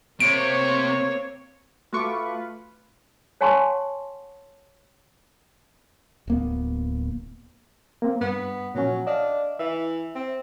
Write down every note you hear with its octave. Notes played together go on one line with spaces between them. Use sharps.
C3 A#3 C4 C#5 D7
A3 F4 F#4 B4 C#6 D6
C#5 F#5 G#5 A5 C6 C#6
D1 A#3 B3
A#3 C4
G2 B3
A#2 F3 F#3 C#4
D4 D#5 F5
E3 E5
C4